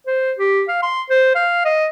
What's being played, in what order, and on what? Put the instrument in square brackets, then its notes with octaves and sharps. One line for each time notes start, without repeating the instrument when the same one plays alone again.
[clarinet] C5
G4
F5
C6
C5
F5
D#5